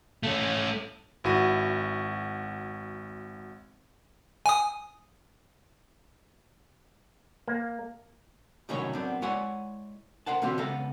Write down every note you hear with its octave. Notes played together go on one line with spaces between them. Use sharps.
A3 C#4
G#1 E4 F#4 D#7
G#5 D#6
A#3
C2 A2 D#3 F#3 C#4 C#5
F#2 B3 C4 D4
G#3 E4 C#5 D5 F#5 G#5
A#4 C5 F#5 A5
B2 D3 E3 C4 F4 G4
C#2 B3 A4 E5 F5 A#5